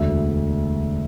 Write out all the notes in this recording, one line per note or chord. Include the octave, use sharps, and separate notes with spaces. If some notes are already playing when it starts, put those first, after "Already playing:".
Already playing: E1 D2 D3 A3 E5